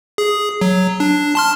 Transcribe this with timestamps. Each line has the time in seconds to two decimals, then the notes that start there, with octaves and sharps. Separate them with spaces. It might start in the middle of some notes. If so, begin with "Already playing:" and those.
0.18 G#4
0.61 F#3
1.00 D4
1.35 A5 C6 F6